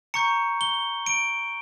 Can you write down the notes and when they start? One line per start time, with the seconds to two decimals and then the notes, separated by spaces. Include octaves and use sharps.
0.14 A#5 C#6 G6 C#7
0.61 G7
1.06 D7